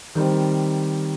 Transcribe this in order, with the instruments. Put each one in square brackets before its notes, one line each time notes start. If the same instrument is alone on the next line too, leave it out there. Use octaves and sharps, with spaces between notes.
[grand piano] D#3 G3 C4